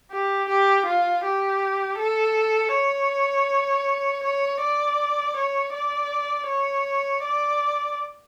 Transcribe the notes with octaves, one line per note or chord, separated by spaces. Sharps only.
G4
G4
F4
G4
A4
C#5
C#5
D5
C#5
D5
C#5
D5